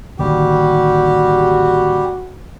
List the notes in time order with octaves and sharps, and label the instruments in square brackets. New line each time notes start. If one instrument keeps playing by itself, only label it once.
[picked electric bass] A1 D#3 [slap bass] D3 A#3 [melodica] G3 G4 [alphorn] F#4